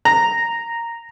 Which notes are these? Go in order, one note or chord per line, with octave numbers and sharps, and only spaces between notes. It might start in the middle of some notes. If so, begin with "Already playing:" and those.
A#5